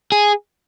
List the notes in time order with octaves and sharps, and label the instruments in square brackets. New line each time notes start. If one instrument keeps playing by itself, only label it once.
[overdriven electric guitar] G#4